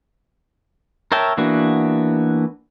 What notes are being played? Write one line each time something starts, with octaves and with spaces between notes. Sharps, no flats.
A#4 C#5 E5 G5 A5
E3 A#3 B3 D4 F#4